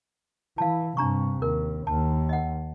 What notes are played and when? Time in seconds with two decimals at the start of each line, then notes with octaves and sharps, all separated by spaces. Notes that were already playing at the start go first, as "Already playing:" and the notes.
0.58 E3 F5 A5
0.97 G2 C3 D4 A#5 C#6
1.42 D#2 A#4
1.87 D#2 A5
2.29 D#5 F#5